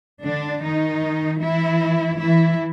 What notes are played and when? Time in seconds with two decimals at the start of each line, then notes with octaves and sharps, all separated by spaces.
0.24 D3 D4
0.64 D#3 D#4
1.42 E3 E4
2.19 E3 E4